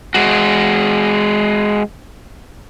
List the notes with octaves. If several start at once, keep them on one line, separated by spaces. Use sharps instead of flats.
G#3 F#4